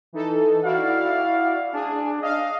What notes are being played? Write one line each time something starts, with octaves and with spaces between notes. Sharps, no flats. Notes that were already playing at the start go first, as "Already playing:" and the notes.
E3 D#4 A4
E4 F#4 D5 F5
D4 G#4
D#5 F5